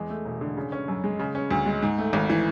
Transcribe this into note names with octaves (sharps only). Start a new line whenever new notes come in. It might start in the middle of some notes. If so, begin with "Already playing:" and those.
Already playing: E2 G#3
A3
E1
D3
C#3
C#4
F#2
G#3
C#3
C#4
D2
G#3
G#2
A3
G#1
E3